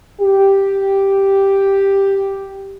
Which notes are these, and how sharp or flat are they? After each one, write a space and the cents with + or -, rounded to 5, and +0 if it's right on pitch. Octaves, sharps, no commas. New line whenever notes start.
G4 +0